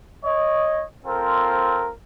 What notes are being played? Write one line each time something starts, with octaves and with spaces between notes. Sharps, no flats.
C#5 D#5
C4 F4 A4 A#4 C5